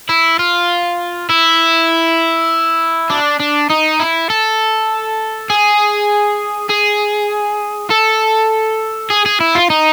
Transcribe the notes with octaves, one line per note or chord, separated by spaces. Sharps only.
E4
F4
E4
D4
D4
D#4
E4
A4
G#4
G#4
A4
G#4
G#4
E4
F4
D#4